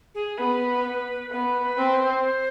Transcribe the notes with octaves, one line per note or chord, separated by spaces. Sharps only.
G#4
B3 B4
B3 B4
B4
C4
C5